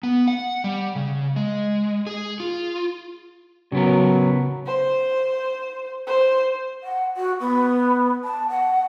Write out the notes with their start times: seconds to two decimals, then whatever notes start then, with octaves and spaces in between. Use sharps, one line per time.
0.03 B3
0.28 F#5
0.64 G3
0.96 C#3
1.36 G#3
2.07 G#4
2.40 F4
3.72 C#3 F#3 B3 A#4
4.66 C5
6.07 C5
6.83 F#5
7.16 F#4
7.40 B3
8.24 A5
8.49 F#5